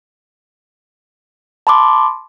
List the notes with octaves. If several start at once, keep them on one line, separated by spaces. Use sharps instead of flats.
A5 B5 C6 D6